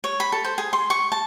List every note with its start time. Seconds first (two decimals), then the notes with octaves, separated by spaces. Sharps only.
0.04 C#5
0.20 B5
0.32 A4
0.44 C5
0.58 G#4
0.73 C6
0.90 C#6
1.12 A5